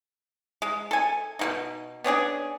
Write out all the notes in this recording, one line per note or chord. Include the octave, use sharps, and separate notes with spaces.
G#3
A4 G#5
B2 A#3 D#4
B3 C#4 D4 G#4